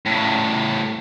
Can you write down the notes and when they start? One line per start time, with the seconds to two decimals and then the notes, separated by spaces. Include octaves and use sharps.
0.05 A2 C#3